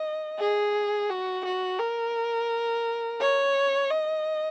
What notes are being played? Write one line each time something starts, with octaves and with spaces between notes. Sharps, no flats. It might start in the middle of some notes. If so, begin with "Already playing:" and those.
Already playing: D#5
G#4
F#4
F#4
A#4
C#5
D#5